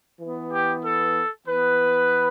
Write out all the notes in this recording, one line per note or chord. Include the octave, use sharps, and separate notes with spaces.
E3 B3
G4
A4
E3 B3 B4